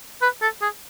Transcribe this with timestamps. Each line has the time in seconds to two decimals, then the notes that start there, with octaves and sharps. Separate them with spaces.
0.22 B4
0.42 A4
0.62 G#4